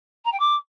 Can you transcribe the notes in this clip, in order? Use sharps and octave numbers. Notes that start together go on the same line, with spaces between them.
A#5
G5
D6